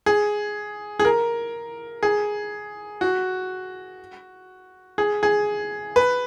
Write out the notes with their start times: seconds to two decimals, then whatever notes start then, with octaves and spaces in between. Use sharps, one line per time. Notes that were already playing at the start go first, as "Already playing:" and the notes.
0.06 G#4
0.99 G#4
1.05 A#4
2.03 G#4
3.01 F#4
4.98 G#4
5.23 G#4
5.96 B4